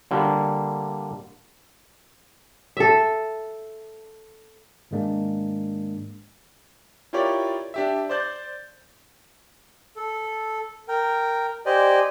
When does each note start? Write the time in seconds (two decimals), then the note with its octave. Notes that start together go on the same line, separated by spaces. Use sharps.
0.11 D3 G3 A#3
2.77 A4 E5
4.91 G#2 D#3 G#3 A#3 D4
7.13 E4 F4 G4 A#4 C#5 D5
7.74 D4 G4 E5
8.09 C5 D5 G6 A6
9.96 A4
10.88 A#4 G5
11.66 G4 C5 D5 D#5 G#5